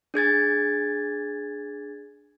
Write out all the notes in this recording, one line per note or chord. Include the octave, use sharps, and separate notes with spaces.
D4 G#4 G#6 A6